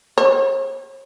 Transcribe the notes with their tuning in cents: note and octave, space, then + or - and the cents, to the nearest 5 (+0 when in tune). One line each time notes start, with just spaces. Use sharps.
C#5 -45